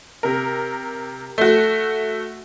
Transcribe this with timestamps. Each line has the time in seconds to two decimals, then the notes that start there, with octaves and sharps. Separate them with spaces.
0.23 C3 A#4
1.38 A3 F#4